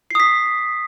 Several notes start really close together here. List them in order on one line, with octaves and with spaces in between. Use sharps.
C7 D#6 B6